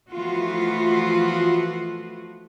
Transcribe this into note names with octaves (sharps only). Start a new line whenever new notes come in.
E3 F3 A3 B3 F4 F#4